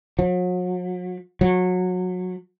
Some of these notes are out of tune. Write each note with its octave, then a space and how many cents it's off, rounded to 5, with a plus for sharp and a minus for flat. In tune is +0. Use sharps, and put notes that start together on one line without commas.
F#3 -40
F#3 -25